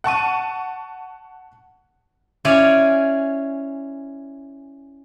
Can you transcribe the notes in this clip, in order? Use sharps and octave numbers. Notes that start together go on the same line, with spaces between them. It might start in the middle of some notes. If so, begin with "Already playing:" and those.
F#5 A5 C#6 D#7
C#4 E4 C#5 D5 F5 G#5